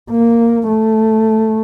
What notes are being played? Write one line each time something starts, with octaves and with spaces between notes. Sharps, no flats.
A#3
A3